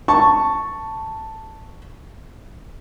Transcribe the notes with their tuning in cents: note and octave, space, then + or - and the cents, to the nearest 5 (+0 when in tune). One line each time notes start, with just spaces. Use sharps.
A5 +5 C#6 +0